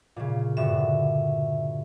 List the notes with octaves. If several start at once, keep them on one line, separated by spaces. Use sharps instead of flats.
A#2 C#3
G2 D3 F#4 E5